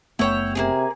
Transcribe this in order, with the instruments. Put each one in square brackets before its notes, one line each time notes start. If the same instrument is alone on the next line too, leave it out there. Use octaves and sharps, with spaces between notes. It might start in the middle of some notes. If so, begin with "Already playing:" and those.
[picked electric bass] F#1 A3 B3 [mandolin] E4 C#5 G5
[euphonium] C3 [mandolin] A#3 D#4 G#4